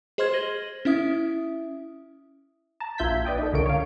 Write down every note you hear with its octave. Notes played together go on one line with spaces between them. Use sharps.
G#4 C5 D#5 C6 F6 G#6
G#6 A#6 D#7 F#7 G7
C#4 E4 E5 D#6
A5 A#5
A#1 F4 E5 G6 G#6 B6
B4 D5 D#5 G5
D#4 A4
C#2 D3 A#4 C#5 D7
C#5 F5